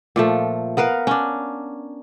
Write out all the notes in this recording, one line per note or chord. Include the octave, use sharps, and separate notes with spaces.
A#2 F3 A3
B3 A#4 B4 F5
C#4 D4